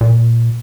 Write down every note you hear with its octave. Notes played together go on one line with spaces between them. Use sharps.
A#2